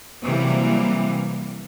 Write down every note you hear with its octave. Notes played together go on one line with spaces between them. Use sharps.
C3 E3 F#3 G3 A#3